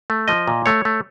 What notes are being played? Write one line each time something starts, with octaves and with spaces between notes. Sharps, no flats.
A3
F3 D#5
A#2
A3 C#5
A3